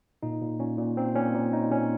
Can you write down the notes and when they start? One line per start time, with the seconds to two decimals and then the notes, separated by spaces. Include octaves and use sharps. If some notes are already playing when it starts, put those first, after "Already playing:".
0.23 A#2 D#4
0.42 A#2
0.60 A#2 C#4
0.78 A#2
0.97 A#2 C4
1.15 A#2 C#4
1.35 A#2
1.53 A#2 D#4
1.71 A#2 C#4